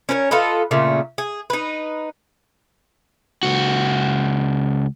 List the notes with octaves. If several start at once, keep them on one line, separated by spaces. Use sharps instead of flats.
C#4 A#4 B4 C#5
F4 A4 B4 D#5
A#2 C#3 A3
G#4
D#4 B4
C#2 F#4